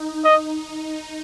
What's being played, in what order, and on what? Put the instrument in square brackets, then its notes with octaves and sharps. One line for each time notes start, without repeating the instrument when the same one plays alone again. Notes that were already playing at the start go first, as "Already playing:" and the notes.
Already playing: [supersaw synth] D#4
[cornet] D#5